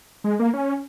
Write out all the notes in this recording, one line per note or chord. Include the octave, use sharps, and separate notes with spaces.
G#3
A#3
C#4